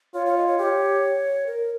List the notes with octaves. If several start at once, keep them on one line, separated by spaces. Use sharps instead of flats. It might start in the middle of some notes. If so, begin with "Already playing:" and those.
F4 C#5
C#5
D#5
C#5
G4 C#5
A#4